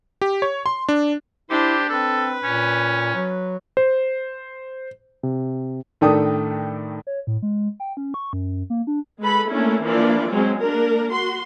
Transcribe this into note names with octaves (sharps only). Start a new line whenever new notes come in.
G4
C#5
C6
D4
D4 E4 G4 C5
C4 A4 B4
A#2 C#4
F#3
C5
C3
A2 D#3 A3 D4 G5 D#6
C#5
A2
G#3
G5
C#4
C#6
F#2
A#3
D4
G#3 A4 B4 B5
A3 A#3 C#4 D4 E4
E3 F3 A#3 D4 F4 D5
F#3 G#3 C4 C#4
A#3 D4 A#4
F#4 C6